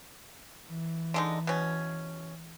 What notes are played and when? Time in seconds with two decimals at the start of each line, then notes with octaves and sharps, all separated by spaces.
0.67 E3
1.14 D3 G#3 D#4
1.47 B2 C#4